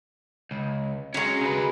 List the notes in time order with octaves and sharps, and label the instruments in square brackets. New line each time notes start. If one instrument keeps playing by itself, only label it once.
[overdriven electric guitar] C#2
[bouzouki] F#3 G#3 [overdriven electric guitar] C#4
[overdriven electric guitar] C#3 B4